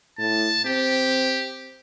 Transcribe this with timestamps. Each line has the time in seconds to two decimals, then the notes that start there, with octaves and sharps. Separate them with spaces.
0.19 A2 A5
0.65 C4 G4